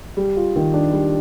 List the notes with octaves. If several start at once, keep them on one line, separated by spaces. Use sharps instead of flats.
G3
F4
D#3
D4
G3